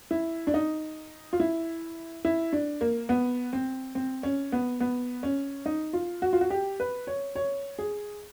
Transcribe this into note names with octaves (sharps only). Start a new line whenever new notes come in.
E4
D4
D#4
F4
E4
E4
D4
A#3
B3
C4
C4
C#4
B3
B3
C#4
D#4
F4
F#4
F4
F#4
G4
B4
C#5
C#5
G#4